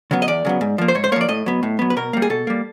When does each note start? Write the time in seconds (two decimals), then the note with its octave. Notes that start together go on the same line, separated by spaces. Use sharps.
0.11 C#3 F#3 B3
0.22 D#5
0.28 E2 D5
0.45 C#3 F#3 B3
0.61 G#2
0.78 F3 A#3
0.88 C5
0.95 G#2 C#5
1.04 C5
1.12 A#3 C#5
1.16 F3 D5
1.28 A2 D#5
1.46 F#3 B3
1.63 A2
1.79 F#3 B3
1.90 B4
1.97 B2 A#4
2.13 G3 A#3
2.22 G#4
2.30 B2 A4
2.47 G3 A#3